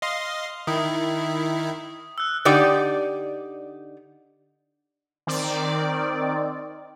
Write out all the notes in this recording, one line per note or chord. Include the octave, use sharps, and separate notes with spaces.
D#5 F5 C6
D#3 E4 D#6
E6 F#6
D3 D#4 G4 D5
D#3 C4 D5